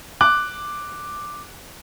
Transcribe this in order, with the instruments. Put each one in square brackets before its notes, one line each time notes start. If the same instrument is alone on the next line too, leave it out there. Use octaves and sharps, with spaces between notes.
[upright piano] D6 F#6